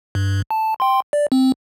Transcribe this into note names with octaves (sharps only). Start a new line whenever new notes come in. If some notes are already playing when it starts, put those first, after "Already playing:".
G2
A5
G5 C6
D5
C4